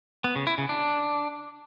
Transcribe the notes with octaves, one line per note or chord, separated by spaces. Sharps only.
B3
C#3
E4
C#3
D4